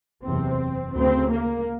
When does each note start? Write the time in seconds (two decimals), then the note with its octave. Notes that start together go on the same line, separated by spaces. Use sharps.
0.24 F#1 E2 C3 C4
0.94 D2 C#3 C4
1.31 A#3